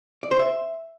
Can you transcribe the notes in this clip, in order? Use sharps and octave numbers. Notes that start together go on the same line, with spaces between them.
D5
C5
E5